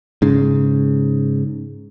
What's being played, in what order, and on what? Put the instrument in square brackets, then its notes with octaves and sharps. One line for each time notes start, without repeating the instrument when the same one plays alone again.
[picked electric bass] G#2 C#3